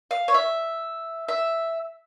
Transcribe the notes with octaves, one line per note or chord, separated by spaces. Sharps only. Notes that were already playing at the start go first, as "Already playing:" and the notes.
F5
C#5
E5
E5